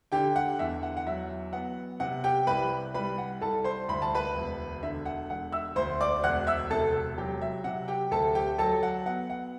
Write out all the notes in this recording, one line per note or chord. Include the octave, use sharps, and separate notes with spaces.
D3 G4 G5
F#5
E2 E5
F#5
F#5
F#3 E5
B3 F#5
C3 F#5
G4 G5
C2 B4 B5
G3 B4 B5
F#5
C2 A4 A5
C5 C6
D2 B5
A5
B4 B5
E1
D3 E5
F#5
E1 F#5
E5 E6
D2 C5 C6
D5 D6
E1 F#5 F#6
E5 E6
C3 A4 A5
F#3 G4 G5
E5
C3 F#5
G4 G5
D2 A4 A5
G4 G5
F#3 A4 A5
F#5
B3 F#5
F#5